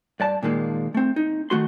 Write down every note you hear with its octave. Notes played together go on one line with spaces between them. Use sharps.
G2 D5 A5
A#2 D#3 G#3 A#3
A3 C4
D#4
D#3 A3 F#4 C6